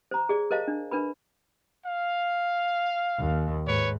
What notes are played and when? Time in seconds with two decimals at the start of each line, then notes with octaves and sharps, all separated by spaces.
0.11 C5 A#5
0.29 G#4 D5
0.51 A#4 C5 D#5 F5 A5
0.68 D4
0.91 D4 A#4 B4 B5
1.86 F5
3.19 D#2
3.67 G#2 B4 C#5